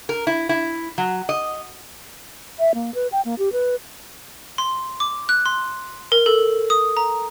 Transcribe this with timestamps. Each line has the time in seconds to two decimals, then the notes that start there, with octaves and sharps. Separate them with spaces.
0.09 A#4
0.27 E4
0.49 E4
0.98 F#3
1.29 D#5
2.59 E5
2.74 A#3
2.95 B4
3.12 G5
3.25 A#3
3.39 G4
3.52 B4
4.58 C6
5.00 D6
5.29 F#6
5.46 C6
6.12 A#4
6.26 A4
6.70 D#6
6.97 A#5